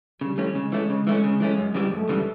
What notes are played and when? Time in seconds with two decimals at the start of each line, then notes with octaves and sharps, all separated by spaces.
0.21 C#3 G3
0.38 E3 A3 C#4
0.55 C#3 G#3
0.72 E3 A3 C#4
0.90 C#3
1.07 E3 A3 C#4
1.24 C#3
1.40 E3 A3 C#4
1.58 F#2
1.74 C#3 E3 G3
1.92 F#2 A3
2.09 C#3 E3 G3